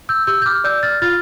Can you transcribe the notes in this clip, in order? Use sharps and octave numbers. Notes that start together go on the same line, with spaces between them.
E6 G6
G4 E6 G6
G6
D6 F6
D5 E6 G6
F6 A6
F4 F6 A6